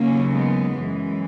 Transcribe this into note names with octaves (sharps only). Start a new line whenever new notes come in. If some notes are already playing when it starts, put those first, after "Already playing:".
Already playing: D#2 C#3 F#3 A#3 C#4
G#3 B3
F#2 E3 G#3